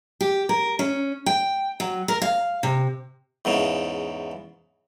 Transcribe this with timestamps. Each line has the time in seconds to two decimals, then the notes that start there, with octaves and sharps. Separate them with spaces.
0.21 G4
0.49 A#4
0.79 C#4
1.26 G5
1.80 F#3
2.08 A#4
2.22 F5
2.63 C3
3.45 E2 G#2 C#3